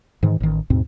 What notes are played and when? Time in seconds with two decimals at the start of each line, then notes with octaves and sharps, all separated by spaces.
0.23 G#2 D#3 E3
0.40 A1 D#3
0.70 D#2 G#2 B2 C4